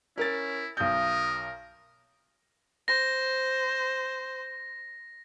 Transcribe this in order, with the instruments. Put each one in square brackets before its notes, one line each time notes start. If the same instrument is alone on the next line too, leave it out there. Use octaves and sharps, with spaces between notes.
[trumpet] C#4 [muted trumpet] E4 [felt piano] A#4 A6
[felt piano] B1 G6 [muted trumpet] A#4 [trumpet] D#6
[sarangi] C5 [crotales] A#6